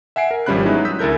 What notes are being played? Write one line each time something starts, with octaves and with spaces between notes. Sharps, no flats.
E5 F#5 G#5 C7 D7
A#4
G#1 F3 G3 C#4 B5 F#6
F#3 G#3 B3 D#4 E4
D#6 E6 G6 B6
D2 E4 A4 A#4 G6